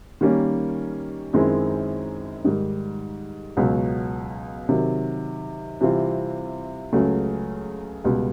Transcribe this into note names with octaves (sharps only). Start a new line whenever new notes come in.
D#3 G3 A#3 C#4
F#2 D#3 G#3 C4 E4
G#2 D#3 G3
C#2 B2 F#3
C3 D#3 F#3
C3 E3 G3 C4 F4
C#2 C#3 F#3 A3
C#2 B2 G3